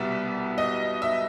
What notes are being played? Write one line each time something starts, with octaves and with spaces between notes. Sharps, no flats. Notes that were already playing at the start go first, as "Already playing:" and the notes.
Already playing: C2 B2 G3 B3 E5
D#5
E5